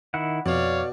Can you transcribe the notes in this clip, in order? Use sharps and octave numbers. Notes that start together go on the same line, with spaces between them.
D#3 E4 F#5
F2 B2 C#5 D5 F5